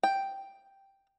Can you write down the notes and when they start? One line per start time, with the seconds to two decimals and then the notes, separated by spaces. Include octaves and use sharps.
0.03 G5